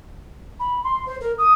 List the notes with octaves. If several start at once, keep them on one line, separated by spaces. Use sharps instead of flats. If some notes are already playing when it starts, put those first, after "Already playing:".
B5
C6
C5
A#4
D#6